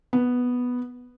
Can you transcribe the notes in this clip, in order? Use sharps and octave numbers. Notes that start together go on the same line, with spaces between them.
B3